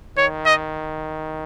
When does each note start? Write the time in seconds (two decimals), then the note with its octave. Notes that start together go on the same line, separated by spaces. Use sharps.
0.17 D#3 C#5
0.46 D#5